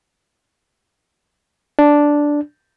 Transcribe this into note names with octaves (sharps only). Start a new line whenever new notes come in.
D4